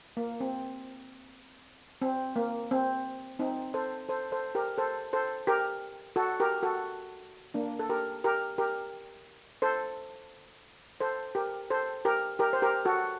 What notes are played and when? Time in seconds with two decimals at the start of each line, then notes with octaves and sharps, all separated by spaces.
0.17 A#3
0.40 C4
2.02 C4
2.36 A#3
2.71 C4
3.39 C4 D#4
3.74 A4 C5
4.09 A4 C5
4.32 A4 C5
4.55 G4 A#4
4.78 A4 C5
5.13 A4 C5
5.47 G4 A#4
6.16 F#4 A4
6.40 G4 A#4
6.63 F#4 A4
7.54 A#3 D4
7.79 A4
7.89 G4 A#4
8.24 G4 A#4
8.58 G4 A#4
9.62 A4 C5
11.00 A4 C5
11.35 G4 A#4
11.70 A4 C5
12.05 G4 A#4
12.39 G4 A#4
12.53 C5
12.62 G4 A#4
12.85 F#4 A4